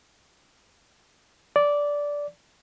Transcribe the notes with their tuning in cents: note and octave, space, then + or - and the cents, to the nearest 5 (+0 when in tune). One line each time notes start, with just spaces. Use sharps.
D5 -10